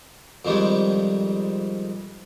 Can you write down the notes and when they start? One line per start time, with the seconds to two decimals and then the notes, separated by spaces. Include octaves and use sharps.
0.45 F2 D#3 G3 G#3